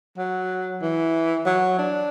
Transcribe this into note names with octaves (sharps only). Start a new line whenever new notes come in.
F#3
E3
F#3
D4